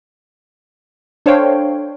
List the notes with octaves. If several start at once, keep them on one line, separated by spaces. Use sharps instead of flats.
D4 A4 C5 C#5 F5 G5